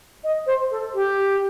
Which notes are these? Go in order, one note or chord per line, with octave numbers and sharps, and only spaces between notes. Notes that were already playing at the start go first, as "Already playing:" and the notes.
D#5
C5
A4
G4